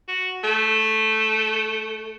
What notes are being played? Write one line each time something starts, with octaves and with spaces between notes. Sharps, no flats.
F#4
A3